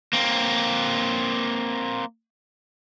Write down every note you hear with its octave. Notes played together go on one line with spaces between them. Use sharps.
A#3 C4